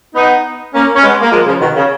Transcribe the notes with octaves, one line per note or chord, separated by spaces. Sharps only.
B3 D#4
A#3 C#4
C#4
G#3 B3
A#3
F3 G#3
C#3 F3
B2 D#3
C#3